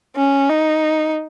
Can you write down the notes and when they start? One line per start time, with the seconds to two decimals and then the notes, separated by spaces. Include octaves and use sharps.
0.16 C#4
0.50 D#4